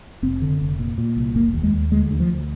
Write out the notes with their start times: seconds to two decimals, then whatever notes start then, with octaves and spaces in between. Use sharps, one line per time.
0.22 F1 C4
0.42 D3
0.60 F1
0.79 A#2
0.98 A#2
1.17 C2
1.35 F1 A#3
1.54 D#2
1.63 G#3
1.73 D#2
1.92 D2 G#3
2.11 D3
2.20 F3
2.29 D2